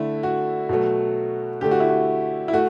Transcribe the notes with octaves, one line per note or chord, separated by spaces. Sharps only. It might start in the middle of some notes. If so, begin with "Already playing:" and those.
Already playing: D3 A3 E4
F#4
B2 F#3 A3
D3 A3 G4
F#4
E4
F#4
E4
A3 F#4